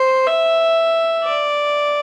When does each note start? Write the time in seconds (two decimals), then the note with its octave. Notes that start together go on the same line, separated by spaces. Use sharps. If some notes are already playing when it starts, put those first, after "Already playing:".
Already playing: C5
0.27 E5
1.24 D5